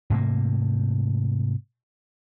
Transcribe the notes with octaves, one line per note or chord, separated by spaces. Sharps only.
G#2 C3 A3 A#3